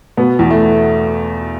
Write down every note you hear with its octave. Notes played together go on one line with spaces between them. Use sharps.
B2 B3
E2
A3